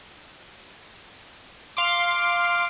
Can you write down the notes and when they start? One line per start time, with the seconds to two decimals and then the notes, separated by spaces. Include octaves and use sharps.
1.77 F5 C6 D6